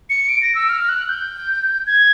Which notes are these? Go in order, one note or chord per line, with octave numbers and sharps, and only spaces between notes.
C#7
D7
A#6
E6
F6
F#6
G6
G#6